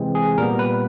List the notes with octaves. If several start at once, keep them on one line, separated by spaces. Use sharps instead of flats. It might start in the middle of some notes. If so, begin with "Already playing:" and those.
Already playing: C3 E3 G#3 C4
G#4
A#2 G3 B3 A#4
B4